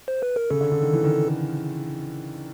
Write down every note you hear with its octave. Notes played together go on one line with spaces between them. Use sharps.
C5
B4
A#4
C#3 A4
D3
D3
D#3
E3
D#3